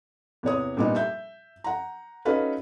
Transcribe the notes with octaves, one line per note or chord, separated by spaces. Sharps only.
E2 C3 C#5 D#6
A#2 G3 B3 D4 D#4
E5 G6
F#5 A#5
C#4 D#4 F#4 A4 B4 F5